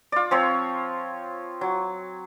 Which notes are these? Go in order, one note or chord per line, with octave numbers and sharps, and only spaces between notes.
F4 D5
F3 C4 C#5
F#3